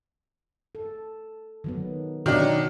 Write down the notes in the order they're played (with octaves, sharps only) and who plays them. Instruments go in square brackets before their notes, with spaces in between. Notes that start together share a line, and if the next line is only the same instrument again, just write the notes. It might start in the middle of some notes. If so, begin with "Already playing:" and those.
[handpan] A4
D#3 F#3 B3
[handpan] B2 C#4 F#5 [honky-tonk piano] D#3 F#3 D4